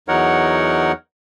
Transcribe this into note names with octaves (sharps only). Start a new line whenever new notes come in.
E2 F#3 D#4 A#4 C#5 F#5